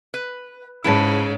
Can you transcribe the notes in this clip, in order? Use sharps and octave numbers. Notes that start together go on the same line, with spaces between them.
B4
G#2 C#3 E4 B4 A5